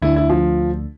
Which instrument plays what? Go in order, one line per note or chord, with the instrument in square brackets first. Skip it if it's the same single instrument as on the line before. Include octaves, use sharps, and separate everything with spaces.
[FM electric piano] D2 D3 A3 D4 [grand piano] E4
[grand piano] E4
F3